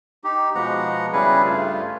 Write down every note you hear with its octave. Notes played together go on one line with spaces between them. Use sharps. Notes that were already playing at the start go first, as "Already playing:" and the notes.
D#4 G4
B2 F3 G#3 B3 F#5 A#5
C#3 G3 E4 G#4 B4
G2 A3 F4